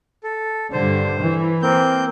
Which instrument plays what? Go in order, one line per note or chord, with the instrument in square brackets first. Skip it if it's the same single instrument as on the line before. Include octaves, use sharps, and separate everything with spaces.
[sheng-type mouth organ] A4
[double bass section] G2 D3 [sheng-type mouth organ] C5
[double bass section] E3
[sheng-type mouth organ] A#3 C4 G6